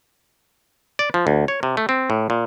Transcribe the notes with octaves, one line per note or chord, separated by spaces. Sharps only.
D5
F3
D2
C#5
C3
A3
C4
A2
A#2